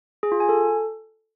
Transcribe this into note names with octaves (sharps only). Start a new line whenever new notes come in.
G#4
F4
G#5
A4